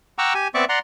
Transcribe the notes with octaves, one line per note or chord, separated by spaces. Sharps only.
F#5 G5 A#5 C#6 D6 E6
G4 G#5
B3 C4 D5 E5 C#6 D6
D5 F#5 A#5 C6